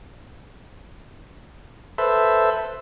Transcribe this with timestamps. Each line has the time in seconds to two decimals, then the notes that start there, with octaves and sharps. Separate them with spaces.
1.98 A4 B4 C5 E5